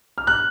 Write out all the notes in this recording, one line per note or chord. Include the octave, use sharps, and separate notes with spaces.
F6
F#6